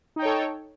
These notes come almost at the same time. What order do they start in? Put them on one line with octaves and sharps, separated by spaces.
D#4 G5 C#5 A4